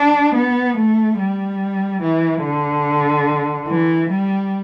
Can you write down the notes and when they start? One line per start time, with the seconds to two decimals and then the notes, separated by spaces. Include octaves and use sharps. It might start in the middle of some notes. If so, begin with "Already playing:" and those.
Already playing: D4
0.35 B3
0.77 A3
1.19 G3
2.02 E3
2.43 D3
3.68 E3
4.10 G3